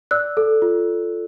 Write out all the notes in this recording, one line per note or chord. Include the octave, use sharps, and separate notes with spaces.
D5 E6 F#6
A4
F4